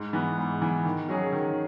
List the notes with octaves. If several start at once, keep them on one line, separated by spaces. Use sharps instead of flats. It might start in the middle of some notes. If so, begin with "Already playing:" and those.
Already playing: G#2
E3 B3
G#2
E3 B3
D#3
F#3 C#4 G#4
D#3